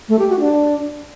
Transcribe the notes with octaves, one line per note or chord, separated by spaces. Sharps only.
A3
G4
F#4
D4